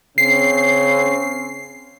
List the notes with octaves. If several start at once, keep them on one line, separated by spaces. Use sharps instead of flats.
C#3 C4 C#4 C7